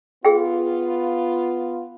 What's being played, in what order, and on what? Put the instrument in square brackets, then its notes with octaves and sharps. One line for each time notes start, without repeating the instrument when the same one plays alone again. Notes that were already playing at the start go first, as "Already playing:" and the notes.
[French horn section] B3 F4 [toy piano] G#4 G5